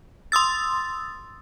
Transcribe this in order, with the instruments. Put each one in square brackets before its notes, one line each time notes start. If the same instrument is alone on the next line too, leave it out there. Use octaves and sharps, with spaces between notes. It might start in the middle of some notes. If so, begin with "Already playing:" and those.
[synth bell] C6 D#6 E6 A6